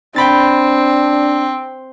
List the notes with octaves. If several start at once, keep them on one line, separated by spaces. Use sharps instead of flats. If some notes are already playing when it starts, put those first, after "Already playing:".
C4 D4 G5 B5 A6